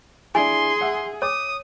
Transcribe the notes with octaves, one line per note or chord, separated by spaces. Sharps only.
D4 E4 G#4 G#5 C6
E5 F#5 E6
C#5 D6 D#6